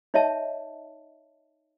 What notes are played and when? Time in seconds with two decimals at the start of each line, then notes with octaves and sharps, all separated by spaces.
0.14 D#4 C#5 D#5 E5 A5